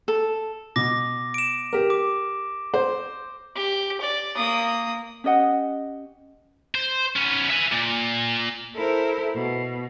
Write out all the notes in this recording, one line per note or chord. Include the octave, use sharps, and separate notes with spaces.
A4
B2 D6 A#6
D7 E7
G4 A#4
D6
C5
G4
D5
A#3 D#6
C#4 G4 D#5 F#5
C5
B3 C#4
E5 G#5
A#2
E4 A4 A#4 C5
B2